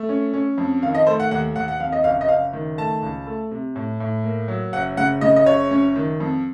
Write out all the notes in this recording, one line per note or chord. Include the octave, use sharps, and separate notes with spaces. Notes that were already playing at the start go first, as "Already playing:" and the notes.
Already playing: A3
C#4
C#4
F2
D#3 F5
D#5
A3 C5
F#5
D#2 F#5
D#2 F#5
F#5
F2 F5
D#5
F#1 F5
D#5
F#1 F5
D#3
A3 A5
C#2
A3
C3
A2
A2
A#3
F#3
F#1 F#5
C#3 F#5
C#3 D#5
D#5
F#1 C#5
C#4
D#3
F2